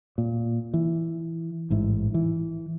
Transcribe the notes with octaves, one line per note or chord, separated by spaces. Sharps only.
A#2
E3
A1 G#2 E3
E3